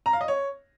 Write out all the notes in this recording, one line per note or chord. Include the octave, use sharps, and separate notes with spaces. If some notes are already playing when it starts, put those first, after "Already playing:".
A#5
F5
D#5
C#5